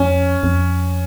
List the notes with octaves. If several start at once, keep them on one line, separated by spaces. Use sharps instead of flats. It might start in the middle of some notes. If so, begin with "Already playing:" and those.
Already playing: F2 C#4
F2